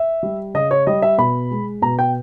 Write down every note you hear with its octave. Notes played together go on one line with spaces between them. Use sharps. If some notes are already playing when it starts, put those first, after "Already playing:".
Already playing: E5
G3
C#3 D#5
C#5
G3 D#5
E5
B2 B5
G#3
B2 A#5
G5